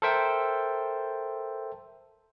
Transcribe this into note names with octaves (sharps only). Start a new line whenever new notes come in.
A4 A#4 C5 E5 G5